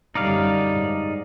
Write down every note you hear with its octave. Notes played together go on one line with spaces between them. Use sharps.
F#2 D3 G3 D#4 D5 F5
G#2